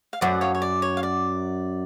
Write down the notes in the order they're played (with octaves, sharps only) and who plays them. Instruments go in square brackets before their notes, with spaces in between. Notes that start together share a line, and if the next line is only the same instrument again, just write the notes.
[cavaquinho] F5
[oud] F#2 [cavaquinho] D5 F#5
[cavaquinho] C#5 F5
C#5
D5
C#5
F5
D5